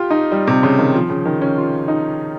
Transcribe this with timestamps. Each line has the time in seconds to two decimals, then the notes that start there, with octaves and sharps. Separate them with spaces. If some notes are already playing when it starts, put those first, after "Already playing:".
Already playing: F4 G4
0.10 D#4
0.32 G3
0.47 C3
0.63 C#3
0.79 D#3
0.95 F3
1.10 C#3
1.25 D#3
1.42 C#4
1.57 F4
1.88 D#4